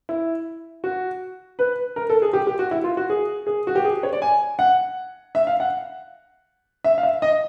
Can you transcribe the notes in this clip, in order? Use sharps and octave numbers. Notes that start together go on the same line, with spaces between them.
E4
F#4
B4
A#4
A4
G#4
G4
G4
F#4
E4
F4
F#4
G#4
G#4
F#4
G4
G#4
C#5
D5
G#5
F#5
E5
F5
F#5
E5
F5
E5
D#5